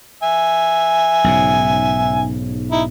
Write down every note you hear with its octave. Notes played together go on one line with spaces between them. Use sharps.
E5 G#5
B1 G#2 C#3
D#4 E4